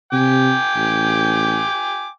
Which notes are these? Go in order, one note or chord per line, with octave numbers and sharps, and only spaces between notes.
C3 G5 G#5 D6
A1